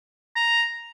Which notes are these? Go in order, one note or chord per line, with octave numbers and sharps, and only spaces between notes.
A#5